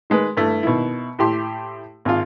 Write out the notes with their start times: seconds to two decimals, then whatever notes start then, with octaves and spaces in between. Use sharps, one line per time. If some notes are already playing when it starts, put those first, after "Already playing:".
0.10 D#3 G#3 B4
0.37 G2 A3 E4
0.63 B2 D#3 E4
1.19 A2 E4 G4 C6
2.05 G#1 F4